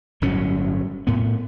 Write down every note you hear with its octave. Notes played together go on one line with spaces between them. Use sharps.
G1 A2 F#3 C#4
A2 B3